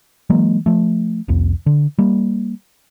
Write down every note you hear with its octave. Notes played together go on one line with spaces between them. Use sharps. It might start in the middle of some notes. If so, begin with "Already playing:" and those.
E3 F#3 G#3 A#3
F3 A3
C2 F2
D3
G3 A#3